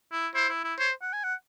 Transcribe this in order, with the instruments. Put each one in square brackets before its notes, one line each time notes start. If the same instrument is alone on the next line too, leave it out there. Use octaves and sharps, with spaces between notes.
[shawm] E4
[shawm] E4 [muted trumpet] C5
[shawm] E4
E4
[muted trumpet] C5 [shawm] C#5
[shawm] F#5
G#5
F#5